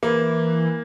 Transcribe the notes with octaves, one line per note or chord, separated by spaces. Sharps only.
E3 A#3